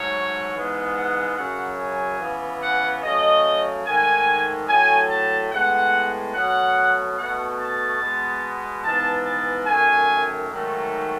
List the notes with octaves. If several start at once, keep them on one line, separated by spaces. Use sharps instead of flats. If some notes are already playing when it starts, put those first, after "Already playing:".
Already playing: G#2 F#3 A3 C#5
G#2 E3 G#3 B3
F#5
F#2 C#3 F#3 F#5
G#5
C#3 E3 B3
F#5
C#3 F#3 A3 D#5
G#2 D#3 A3 G#5
A2 F#3 A3 G#5
A5
A2 G#3 B3 F#5
B2 F#3 A3 F#5
B2 A3 F#5
A5
B2 G#3 B3
G#2 E3 B3 A5
A5
F#2 D#3 A3 G#5
G#2 D#3 F#3 A3